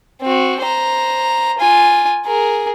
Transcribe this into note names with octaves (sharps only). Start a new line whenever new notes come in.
C4 F#4
C5 A#5
F4 G#5
G#4 A#4